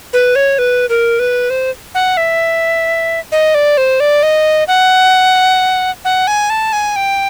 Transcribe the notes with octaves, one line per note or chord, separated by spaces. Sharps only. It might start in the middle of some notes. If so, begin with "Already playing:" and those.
B4
C#5
B4
A#4
B4
C5
F#5
E5
D#5
D5
C5
D5
D#5
F#5
F#5
G#5
A5
G#5
G5